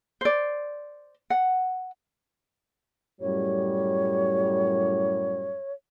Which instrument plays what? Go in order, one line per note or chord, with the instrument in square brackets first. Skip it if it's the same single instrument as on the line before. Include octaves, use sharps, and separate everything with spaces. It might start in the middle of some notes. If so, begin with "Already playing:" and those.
[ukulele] C5 D5
F#5
[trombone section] F#2 A2 G3 [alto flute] C#5